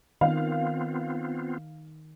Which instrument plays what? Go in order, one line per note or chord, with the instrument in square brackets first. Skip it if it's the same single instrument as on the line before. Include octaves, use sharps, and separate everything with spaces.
[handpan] D#3 [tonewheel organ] B3 C4 F4 [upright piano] F5